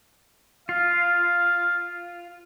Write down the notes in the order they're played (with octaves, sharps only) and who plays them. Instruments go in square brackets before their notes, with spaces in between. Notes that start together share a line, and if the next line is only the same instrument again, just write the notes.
[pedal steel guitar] F4 [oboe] F5